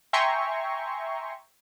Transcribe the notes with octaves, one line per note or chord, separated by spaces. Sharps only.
E5 G5 G#5 A#5 C6 C#6